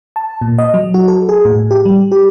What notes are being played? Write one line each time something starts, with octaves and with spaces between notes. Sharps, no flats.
A5
A#2
D#5
F#3
F#4
A4
G#4
A2
G4
G3
G4